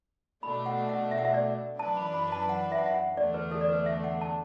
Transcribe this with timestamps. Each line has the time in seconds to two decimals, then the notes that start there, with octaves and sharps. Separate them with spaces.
0.43 B2 A3 D4 B5
0.66 F#5
0.89 F#5
1.11 E5
1.18 F#5
1.25 E5
1.34 D5
1.79 F#2 E3 D4 B4 A5
1.97 B5
2.14 B5
2.32 A5
2.49 F#5
2.72 E5
2.79 F#5
2.86 E5
2.94 F#5
3.17 E2 D3 A3 D4 D5
3.34 B4
3.51 A4
3.61 D5
3.69 B4
3.86 E5
4.04 F#5
4.21 A5